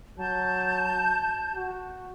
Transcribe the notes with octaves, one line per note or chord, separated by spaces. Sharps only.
F#3 A5 G6
F#4